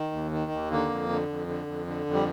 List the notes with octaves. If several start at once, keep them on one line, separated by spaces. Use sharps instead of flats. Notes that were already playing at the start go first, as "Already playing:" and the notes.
Already playing: D#3
D#2
D#3
D#2
D3 A#3
F2
D3
F2
D3
F2
D3
F2
G3